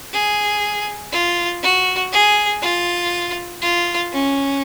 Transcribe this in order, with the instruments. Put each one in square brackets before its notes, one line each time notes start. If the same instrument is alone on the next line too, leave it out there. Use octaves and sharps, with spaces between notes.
[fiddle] G#4
F4
F#4
G#4
F4
F4
C#4